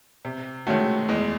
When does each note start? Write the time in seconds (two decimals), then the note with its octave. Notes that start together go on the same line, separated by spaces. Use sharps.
0.25 C3
0.67 D#3 G#3 A3 C#4 F#4
1.08 E2 G#3